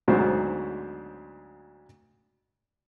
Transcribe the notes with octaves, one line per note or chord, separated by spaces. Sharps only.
D2 G#2 B2 F#3 F#4 C5